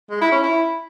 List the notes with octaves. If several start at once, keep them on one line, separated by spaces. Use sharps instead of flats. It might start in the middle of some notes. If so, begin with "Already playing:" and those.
G#3
E4
C#4
E4